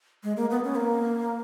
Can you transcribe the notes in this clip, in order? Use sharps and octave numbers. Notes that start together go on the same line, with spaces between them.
G#3
A#3
B3
C#4
A#3